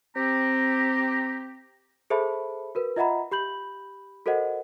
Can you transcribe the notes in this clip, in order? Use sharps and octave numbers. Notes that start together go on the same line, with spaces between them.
C4 G4 A#5
G#4 A4 C5 E5 A5 B5
F#4 A#4 B4
F4 D#5 E5 F#5 A#5 B5
G4 B5 G6 F#7
F#4 A4 A#4 C5 D#5 F#5